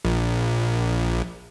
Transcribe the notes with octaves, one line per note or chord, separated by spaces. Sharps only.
A#1